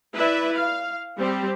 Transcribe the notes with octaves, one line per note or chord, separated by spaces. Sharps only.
E4 B4 D5 E5
F5
G3 C4 G4